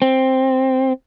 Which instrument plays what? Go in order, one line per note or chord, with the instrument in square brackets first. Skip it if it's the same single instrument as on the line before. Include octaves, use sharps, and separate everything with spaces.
[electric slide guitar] C4